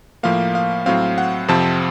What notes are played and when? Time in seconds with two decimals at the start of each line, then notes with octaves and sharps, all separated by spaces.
0.23 A2 F3 A#3 F5
0.55 F5
0.86 A2 F#3 C4 F5
1.18 F#5
1.48 F2 C3 F3 C4 A5